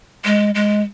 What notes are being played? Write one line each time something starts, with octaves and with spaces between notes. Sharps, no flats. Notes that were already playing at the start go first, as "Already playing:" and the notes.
G#3
G#3